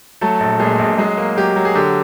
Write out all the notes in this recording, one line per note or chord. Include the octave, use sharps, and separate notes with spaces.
F#3 A3 A4
A#1
A#2 G#3 G#4
A#1
F#3 G#3 G#4
A#3
F#3 G4
F#3
G#4
D3 G4